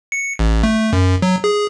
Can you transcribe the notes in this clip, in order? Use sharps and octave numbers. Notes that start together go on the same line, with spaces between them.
C#7
A1
A3
F#2
F#3
G#4